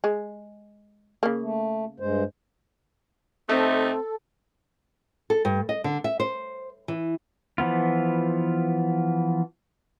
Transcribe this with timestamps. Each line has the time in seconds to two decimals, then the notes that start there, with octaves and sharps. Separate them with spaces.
0.04 G#3
1.23 C#3 A#3
1.42 A3
2.00 G2 G#3 C5
3.49 C3 A3 C4 D#4 A4
5.30 A4
5.45 G2
5.69 D#5
5.84 D3
6.04 E5
6.20 C5
6.88 E3
7.58 E3 F3 B3 F4